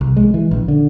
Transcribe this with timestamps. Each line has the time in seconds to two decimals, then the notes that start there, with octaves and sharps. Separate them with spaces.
0.01 C2
0.17 G#3
0.34 E3
0.51 A#1
0.68 D3